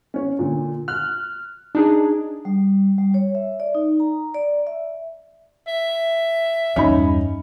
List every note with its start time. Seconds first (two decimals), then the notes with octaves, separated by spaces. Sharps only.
0.14 C#4 C#5
0.39 A#2 D3
0.88 F6 F#6
1.75 D4 D#4 G#4
2.45 G3
2.98 G3
3.14 C#5
3.35 E5
3.60 D5
3.75 D#4
4.00 A#5
4.34 D5
4.67 E5
5.68 E5
6.76 E2 G2 C#4 D#4 B5